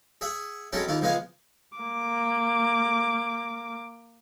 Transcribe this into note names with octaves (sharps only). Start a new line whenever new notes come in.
G#4 E5 F#5
F#3 G#3 C4 C#4 E4 A4
D#2 E4 F4
C#2 F3 G#3 B3 F5 G#5
A#3 D6